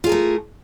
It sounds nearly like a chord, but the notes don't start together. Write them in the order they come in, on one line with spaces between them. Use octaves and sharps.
F4 G#4 A#4 A3